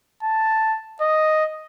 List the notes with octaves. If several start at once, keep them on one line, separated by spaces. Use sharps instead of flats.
A5
D#5